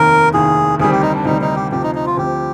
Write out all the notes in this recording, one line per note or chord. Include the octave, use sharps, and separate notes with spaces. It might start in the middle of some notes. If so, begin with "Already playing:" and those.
Already playing: F1 D#2 D#3 A#4
F1 D#2 D#3 G#4
D2 C3 D#3 G3 G#4
G4
D#4
D4
D2 C3 D#3 G3 D#4
D#4
G4
D2 C3 F3 G4
D#4
D#4
F4
D2 C3 F3 G4